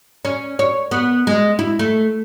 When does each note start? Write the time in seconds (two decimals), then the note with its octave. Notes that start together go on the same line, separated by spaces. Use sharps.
0.25 C#4
0.59 C#5
0.91 B3
1.27 G#3
1.59 E4
1.79 A3